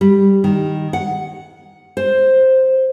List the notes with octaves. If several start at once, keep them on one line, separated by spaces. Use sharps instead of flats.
G3
D#3
F#5
C5